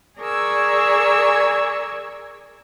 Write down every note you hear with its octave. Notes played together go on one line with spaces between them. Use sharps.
G#4 A#4 D5 G#5 C#6 E6